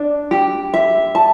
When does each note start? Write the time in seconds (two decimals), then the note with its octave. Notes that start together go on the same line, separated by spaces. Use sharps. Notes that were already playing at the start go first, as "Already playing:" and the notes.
Already playing: D4
0.31 G4
0.74 E5
1.15 A5